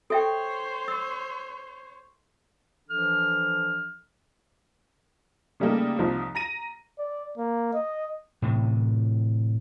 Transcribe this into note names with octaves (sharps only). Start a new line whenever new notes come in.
A4 C5 C#5 E5 G5
E6
E3 F3 D4 A4 F6
C#3 G3 A3 A#3 D#4
C2 F3 D#4
A#5 A#6 D#7
D5
A#3
D#5
A2 C3 E3